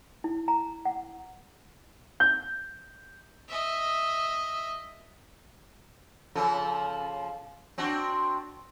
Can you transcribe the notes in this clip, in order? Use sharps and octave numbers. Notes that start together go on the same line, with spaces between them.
E4
A#5
F#5
G6
D#5 E5
C#3 F3 A4
C4 D4 F#4